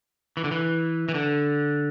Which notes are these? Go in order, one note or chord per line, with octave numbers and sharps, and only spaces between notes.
E3
D3
E3
E3
D3